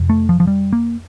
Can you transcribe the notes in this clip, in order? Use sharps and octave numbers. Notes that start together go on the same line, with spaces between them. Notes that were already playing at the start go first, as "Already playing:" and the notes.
Already playing: F2 C3
A3
F3
F3
G3
A#3